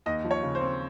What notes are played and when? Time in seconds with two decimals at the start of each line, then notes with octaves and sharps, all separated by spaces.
0.06 D#2 D#5
0.24 F3
0.31 C#5
0.43 C#3
0.55 C5
0.61 C4